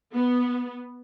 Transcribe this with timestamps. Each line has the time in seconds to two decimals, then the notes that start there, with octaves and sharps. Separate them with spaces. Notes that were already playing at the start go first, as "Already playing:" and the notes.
0.14 B3